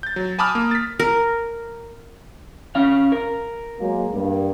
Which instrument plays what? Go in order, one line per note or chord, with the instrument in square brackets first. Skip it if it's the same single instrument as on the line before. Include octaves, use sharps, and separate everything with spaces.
[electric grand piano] G6 A6
F#3
G#5 A5 B5 D6 D#6 F6
A#3
A6 B6
[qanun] A#4
[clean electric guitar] C#4 F5
A#4
[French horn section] F#3 G#3 A#3
G2 A#3